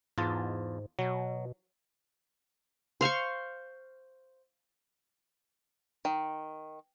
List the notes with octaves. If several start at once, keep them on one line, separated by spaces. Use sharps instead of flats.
E2 G#2 F4 A5
B2 F#3
C5 F5 C6 C#6
D#3